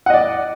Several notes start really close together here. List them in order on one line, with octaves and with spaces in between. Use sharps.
F#5 D#5 D5